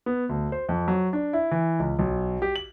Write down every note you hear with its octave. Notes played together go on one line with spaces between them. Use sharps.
B3
D2
C5
F2
F#3
D4
E4
E3
C#2
B1
G4
F#7